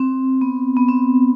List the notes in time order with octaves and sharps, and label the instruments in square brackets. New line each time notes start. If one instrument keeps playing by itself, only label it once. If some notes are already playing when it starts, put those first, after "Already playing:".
Already playing: [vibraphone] C4
B3
B3
C4